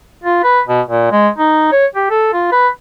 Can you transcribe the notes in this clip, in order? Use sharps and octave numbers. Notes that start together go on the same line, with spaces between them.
F4
B4
B2
A#2
G#3
D#4
C#5
G4
A4
F4
B4